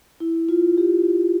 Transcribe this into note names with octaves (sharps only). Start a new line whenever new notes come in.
E4
F4
G4